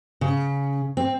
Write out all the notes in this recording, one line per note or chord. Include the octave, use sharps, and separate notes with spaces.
C#3
C4